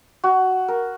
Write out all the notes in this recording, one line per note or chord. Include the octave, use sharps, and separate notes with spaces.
F#4
A#4